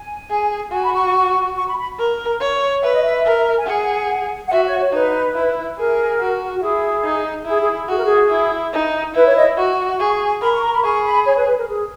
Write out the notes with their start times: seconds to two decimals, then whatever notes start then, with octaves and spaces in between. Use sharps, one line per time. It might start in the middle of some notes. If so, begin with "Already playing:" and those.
Already playing: G#5
0.30 G#4
0.72 F#4 G#5
0.83 B5
0.93 C#6
1.56 C#6
1.67 B5
1.78 B5
1.99 A#4
2.41 C#5
2.83 B4 E5
2.93 D#5
3.03 E5
3.25 A#4
3.58 G#5
3.67 G#4 F#5
4.47 F#5
4.51 F#4 E5
4.66 C#5
4.79 C#5
4.93 D#4 B4
5.35 E4
5.78 G#4 A#4
6.20 F#4
6.54 F#4
6.62 E4 G#4
7.04 D#4
7.46 E4 G#4
7.61 G#4
7.89 F#4 G#4
7.96 A#4
8.04 G#4
8.31 E4
8.73 D#4
9.15 E4 B4
9.25 C#5
9.36 D#5
9.57 F#4 C#6
9.99 G#4
10.41 A#4 B5
10.53 C#6
10.62 A#5
10.73 B5
10.83 G#4 C#6
11.04 B5
11.26 C#5
11.36 B4
11.46 B4
11.57 A#4
11.68 G#4